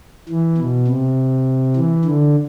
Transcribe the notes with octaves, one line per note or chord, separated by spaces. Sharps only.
E3
B2
C3
E3
D3